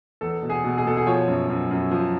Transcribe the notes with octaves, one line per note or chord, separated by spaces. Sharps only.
E2 A4
B2
G#4
B2
G#4
B2 A4
G#4
F3 C#5
F#2
F#2
F#2
F3